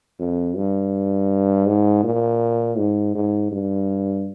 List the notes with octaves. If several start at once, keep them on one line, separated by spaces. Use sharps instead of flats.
F2
G2
G#2
A#2
G#2
G#2
G2